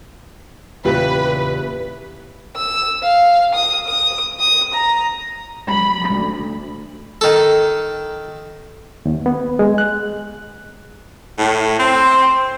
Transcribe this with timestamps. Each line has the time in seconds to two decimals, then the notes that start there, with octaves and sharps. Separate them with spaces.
0.85 E2 A#2 C#3 E4 F4 G4 B4
2.56 E6
3.03 F5
3.54 D#6
3.87 D#6
4.40 D#6
4.74 A#5
5.69 B5
6.10 D2
7.21 D#3 A4
9.05 D#2
9.26 B3
9.59 G#3
9.78 F#6
11.39 A2
11.80 C4 C5